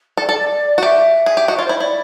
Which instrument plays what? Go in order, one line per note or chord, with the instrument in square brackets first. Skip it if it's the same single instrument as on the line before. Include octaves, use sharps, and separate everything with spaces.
[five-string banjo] A4 [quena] D5
[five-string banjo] A4
F#4
[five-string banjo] G4 [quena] E5
[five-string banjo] G#4
G4
[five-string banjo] F#4 [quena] D#5
[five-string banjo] F4 [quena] C#5
[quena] C5
[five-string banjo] E4
[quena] C#5
[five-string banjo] E4 [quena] D5